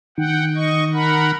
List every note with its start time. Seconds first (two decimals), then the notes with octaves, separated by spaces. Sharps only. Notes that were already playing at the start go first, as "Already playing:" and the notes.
0.18 D#3 F#5 G5
0.55 D#5 C#6
0.94 A#4 F#5 B5